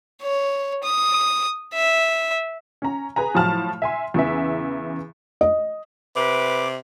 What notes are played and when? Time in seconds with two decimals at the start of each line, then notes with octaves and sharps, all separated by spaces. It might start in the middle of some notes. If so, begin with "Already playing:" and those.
0.22 C#5
0.84 D#6
1.74 E5
2.82 C#4 A#5
3.16 G#4 B4 G#5 A#5
3.34 A2 F3 F#3 A5 F6
3.82 E5 G#5 C6
4.14 E2 C#3 E3 E5
5.41 D#5
6.16 C3 B4 D6